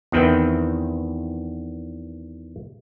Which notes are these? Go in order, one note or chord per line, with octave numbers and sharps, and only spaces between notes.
E2 D#3 C4 B4 E5 G5